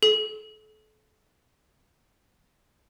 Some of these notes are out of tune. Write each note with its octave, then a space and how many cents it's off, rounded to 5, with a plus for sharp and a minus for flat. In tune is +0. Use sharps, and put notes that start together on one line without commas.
A4 -35